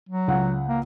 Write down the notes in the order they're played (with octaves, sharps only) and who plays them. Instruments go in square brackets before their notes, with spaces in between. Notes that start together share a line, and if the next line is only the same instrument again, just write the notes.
[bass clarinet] F#3
[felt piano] C#2 F#5
[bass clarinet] A#3